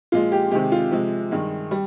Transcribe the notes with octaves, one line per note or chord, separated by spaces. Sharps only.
A#2 F3 G#3 F4
G4
C3 D#3 G#3 G4
F4
C3 F3 G#3
G2 D#3 G#3
G3